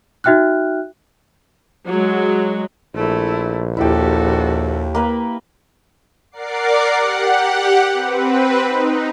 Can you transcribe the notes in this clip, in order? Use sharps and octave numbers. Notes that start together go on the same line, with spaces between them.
D#4 F#4 E5 G5 F6 F#6
F#3 G#3
A#1 A3 E4
D#2 E4 F#4 G4 A4
A#3 B4 B5
A#4 D5 F#5 D6 C7
G4 F#5
C4 B4
D#4